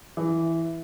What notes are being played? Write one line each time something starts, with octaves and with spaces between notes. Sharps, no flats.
E3